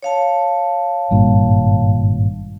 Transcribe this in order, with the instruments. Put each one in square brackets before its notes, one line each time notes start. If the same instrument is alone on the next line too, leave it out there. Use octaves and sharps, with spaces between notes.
[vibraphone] C#5 F5 A5
[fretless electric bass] G#1 G2 A#2